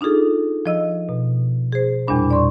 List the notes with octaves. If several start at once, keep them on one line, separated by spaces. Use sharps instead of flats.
D4 D#4 F4 G#4 A4
F3 D#5 E6
B2
G#4 C5
E2 A#2 G3 D4 B5
D5 C6 C#6